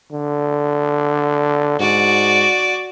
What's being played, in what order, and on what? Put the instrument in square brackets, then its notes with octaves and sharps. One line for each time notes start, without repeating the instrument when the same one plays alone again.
[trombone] D3
[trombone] G#2 [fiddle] F#4 D5